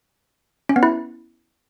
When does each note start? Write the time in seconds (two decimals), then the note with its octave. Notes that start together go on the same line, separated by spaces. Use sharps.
0.69 C#4
0.76 B3
0.83 E4